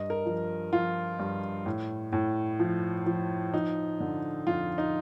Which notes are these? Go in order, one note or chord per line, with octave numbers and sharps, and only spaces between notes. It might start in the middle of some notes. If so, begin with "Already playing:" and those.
Already playing: G2 D#5
A#4
F3
F3 F4
G2
A2
A2
F3
F3
F3 D#4
D3
F2 F4
D#4